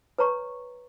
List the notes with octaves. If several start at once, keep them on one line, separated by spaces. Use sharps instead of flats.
B4 C#5 A#5 C#6